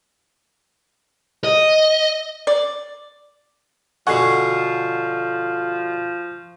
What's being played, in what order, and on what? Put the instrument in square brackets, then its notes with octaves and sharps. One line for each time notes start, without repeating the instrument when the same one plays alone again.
[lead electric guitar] D#5
[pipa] D5
[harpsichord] B2 D3 D#5 [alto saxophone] F3 [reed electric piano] F#5 G#5 [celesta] C#6 C7